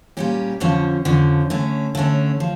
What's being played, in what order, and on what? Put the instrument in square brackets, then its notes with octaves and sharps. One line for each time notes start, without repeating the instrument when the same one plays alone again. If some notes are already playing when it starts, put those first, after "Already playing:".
[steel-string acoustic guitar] A#2 G3 C#4 G4
F2 D3 F3 C#4
F2 D3 F3 C#4
D3 A3 C#4
D3 A3 C#4
F3